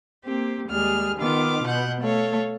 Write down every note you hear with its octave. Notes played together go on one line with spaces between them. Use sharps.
A#3 C4 G4
D#2 G3 G#3 G#4 F6
D#3 B3 F4 D6 F6
B2 B3 F#5 G6
A3 A4 C#5 F5